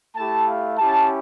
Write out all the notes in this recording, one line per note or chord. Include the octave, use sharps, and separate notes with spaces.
A3 E4 G4 A5
F5
C#4 E4 G4 A5